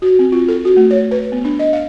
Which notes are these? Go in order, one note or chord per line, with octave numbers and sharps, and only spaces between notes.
F#4
C4
F4
A4
F#4
A3
C#5
B4
B3
D4
D#5
F5